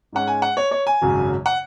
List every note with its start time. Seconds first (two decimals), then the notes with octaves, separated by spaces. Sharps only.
0.12 G#2 G#3 C#4 F#5
0.27 G#5
0.42 F#5
0.57 C#5
0.71 C#5
0.87 G#5
1.01 G#1 F#2 C#3 F#3
1.46 F#5